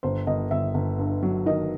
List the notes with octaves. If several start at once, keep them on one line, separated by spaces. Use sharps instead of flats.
G1 C5
G1 D#5
G1 E5
G1
G2
F#3
D#3 D#5